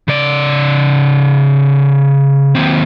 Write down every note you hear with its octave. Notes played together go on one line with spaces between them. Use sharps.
C#3 D5
D#2 C4